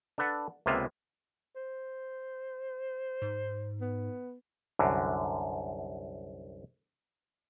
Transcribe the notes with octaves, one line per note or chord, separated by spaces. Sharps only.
D4 A4 B4 F#5 A5
C#2 C3 A#3 B3 F4 E5
C5
G#2
B3
C2 F#2 D3